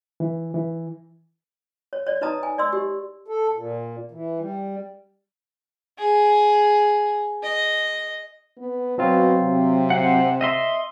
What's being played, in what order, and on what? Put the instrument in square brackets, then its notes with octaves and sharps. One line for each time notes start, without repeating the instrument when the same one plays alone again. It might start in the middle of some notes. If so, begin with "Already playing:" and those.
[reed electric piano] E3
E3
[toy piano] C#5
C#5 D5
D#4 B4 D#5 A5 A#5 D#6
G#5
D5 D#5 C6 E6
G4
[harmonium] A4
A#2
E3
G3
[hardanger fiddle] G#4
D#5
[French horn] B3
[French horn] B2 [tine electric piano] F#3 C4 F4
[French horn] C3
[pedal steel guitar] C5 F#5
D#5 E5 C6